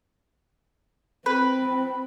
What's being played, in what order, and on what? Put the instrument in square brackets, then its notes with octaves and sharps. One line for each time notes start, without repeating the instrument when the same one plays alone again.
[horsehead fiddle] C4 [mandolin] B4